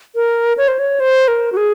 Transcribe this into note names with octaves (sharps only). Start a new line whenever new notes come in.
A#4
C#5
C5
C#5
C5
A#4
F#4
G#4